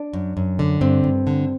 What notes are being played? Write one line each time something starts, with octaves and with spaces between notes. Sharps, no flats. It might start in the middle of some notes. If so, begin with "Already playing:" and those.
Already playing: D4
F#2
F#2
D3
G2 C4
G2
D3